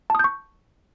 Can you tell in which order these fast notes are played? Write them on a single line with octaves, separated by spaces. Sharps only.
A5 D#6 G6 C#6